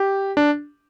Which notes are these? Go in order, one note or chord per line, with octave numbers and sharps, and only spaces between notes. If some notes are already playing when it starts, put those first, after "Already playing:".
Already playing: G4
D4